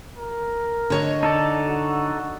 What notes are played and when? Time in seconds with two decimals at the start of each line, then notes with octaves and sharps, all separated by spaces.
0.17 A#4
0.90 D3 C#5 D#5
1.23 D#4 A4 D5 A5
1.66 F#4